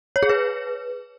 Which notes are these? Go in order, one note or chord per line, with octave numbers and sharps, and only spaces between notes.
C#5
G#4
B4